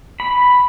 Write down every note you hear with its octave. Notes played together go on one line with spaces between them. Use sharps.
B5